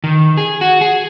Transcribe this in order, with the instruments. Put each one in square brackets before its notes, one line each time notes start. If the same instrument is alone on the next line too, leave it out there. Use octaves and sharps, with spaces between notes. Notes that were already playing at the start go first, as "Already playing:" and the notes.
[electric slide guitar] D#3
G#4
F#4
G#4